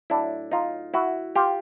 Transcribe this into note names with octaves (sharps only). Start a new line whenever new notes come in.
A2 F#3 D4 E4
D#4 F4
E4 F#4
F4 G4